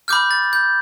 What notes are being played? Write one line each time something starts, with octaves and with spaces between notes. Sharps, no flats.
B5 D6 F6 G6
A6
G6